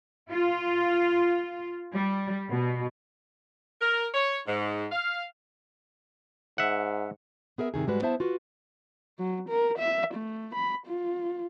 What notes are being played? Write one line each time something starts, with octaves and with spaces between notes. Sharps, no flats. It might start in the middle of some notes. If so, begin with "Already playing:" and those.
F4
G3
B2
A#4
C#5
G#2
F5
G#2 E5 F#5
B3 G#4 A#4 E5
G2 C3 D#3 G#4
G#2 G3 G#3 F#4 B4
B3 E4 C5 E5 A5
F4 F#4 B4
F#3
A#4
E5
A3
B5
F4